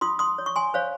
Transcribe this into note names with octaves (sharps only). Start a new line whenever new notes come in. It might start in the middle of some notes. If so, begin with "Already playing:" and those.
F4 C6 D#6
C6 D#6
C#5
C#6
G#5 C6
C5 C#5 F5